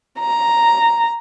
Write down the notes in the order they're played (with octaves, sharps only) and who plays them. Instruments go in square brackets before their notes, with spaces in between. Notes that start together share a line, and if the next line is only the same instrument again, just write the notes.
[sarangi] A#5